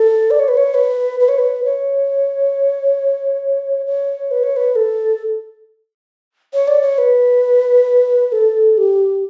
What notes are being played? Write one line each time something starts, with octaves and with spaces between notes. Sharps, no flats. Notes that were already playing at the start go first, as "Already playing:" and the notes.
Already playing: A4
D5
C#5
B4
C#5
B4
B4
C#5
B4
C#5
C#5
B4
C#5
B4
A4
C#5
D5
C#5
B4
A4
G4